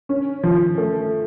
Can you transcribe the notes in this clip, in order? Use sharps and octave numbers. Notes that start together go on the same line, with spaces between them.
C#4
F3
A3